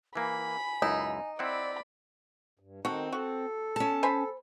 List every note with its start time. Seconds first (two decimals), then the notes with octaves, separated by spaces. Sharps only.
0.15 E3 A#3 G#5 B5
0.82 C#2 F#2 D#4 E4
1.39 C4 E4 D5 F#5 B5
2.59 G2
2.85 D#3 C4 D#4 F#4 A4
3.12 F#4 A4
3.76 C#4 A5
4.03 C5 G#5 B5